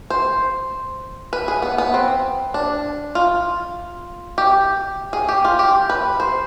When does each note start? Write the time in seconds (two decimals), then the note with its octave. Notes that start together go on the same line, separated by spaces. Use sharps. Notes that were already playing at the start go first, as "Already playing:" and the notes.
0.10 C5
1.33 B4
1.48 G#4
1.62 B3
1.78 B3
1.94 C4
2.54 D4
3.15 F4
4.38 G4
5.13 G#4
5.29 G4
5.45 F4
5.59 G4
5.90 B4
6.20 C5